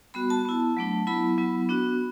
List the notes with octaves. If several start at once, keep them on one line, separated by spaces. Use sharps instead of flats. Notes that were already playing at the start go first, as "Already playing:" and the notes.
G3 B3 F#4 B5
A5
B3 E4
F#3 A3 D4
F#3 B3 E4 B5
F#3 B3 E4
B3 D4 F#4